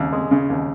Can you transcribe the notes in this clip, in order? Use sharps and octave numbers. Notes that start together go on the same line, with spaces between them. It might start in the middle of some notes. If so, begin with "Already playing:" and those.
Already playing: D#2 C#3
G#3
C#3
D#2